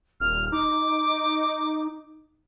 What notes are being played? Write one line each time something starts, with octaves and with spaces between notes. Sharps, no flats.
D#1 F6
D#4 D6